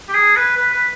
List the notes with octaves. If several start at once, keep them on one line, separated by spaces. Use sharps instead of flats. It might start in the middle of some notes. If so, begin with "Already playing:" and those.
G4
G#4
B4
B4
B4